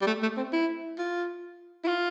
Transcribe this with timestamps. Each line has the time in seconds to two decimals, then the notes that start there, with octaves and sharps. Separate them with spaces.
0.02 G3
0.07 A3
0.22 A3
0.37 C4
0.53 E4
0.98 F4
1.84 E4
1.88 F4